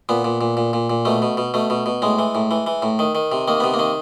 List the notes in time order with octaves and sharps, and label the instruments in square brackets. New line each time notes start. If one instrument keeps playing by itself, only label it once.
[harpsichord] A#2 B3
A#2
A#2
A#2
A#2
A#2
B2 A3
B2
B2
B2 A3
B2
B2
A2 G#3
E3
A2
E3
E3
A2
D#3
D#3
C3
D#3 A#3
C3 B3
A#3
D#3